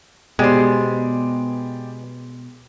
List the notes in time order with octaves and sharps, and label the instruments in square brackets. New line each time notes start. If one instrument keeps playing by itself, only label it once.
[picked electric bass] B2 [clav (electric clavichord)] G#3 [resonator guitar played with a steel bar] B3 C5 [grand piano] G4 D5